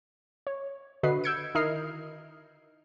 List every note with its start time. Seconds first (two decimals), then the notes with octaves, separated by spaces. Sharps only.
0.47 C#5
1.03 D3 F#4 B4 D#5 C7
1.24 E6 G6 G#6 C#7 D7
1.55 D#3 E4 A#4 D#5 F6 C7